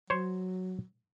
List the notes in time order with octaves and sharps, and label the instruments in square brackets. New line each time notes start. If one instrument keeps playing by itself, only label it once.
[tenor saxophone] F#3 [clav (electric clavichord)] C5 C#5